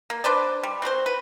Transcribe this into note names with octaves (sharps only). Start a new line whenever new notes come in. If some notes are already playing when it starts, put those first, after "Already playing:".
A#3
D4 B4 C5 D5
G3
C4 F#4 B4 C5
B4